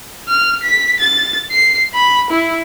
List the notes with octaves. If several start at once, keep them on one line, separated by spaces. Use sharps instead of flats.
F6
B6
A6
C7
B5
E4